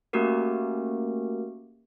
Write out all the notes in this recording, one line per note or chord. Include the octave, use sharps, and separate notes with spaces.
A3 A#3 C#4 F#4 G4 A#4